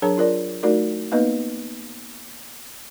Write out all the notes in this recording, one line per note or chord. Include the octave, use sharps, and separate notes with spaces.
F#3 D4 G#4 A#4 C#5 A#5
F4 A#4 D5
A3 D#4 F#4 A#4 D5
A#3 B3 D#4 B4 D#5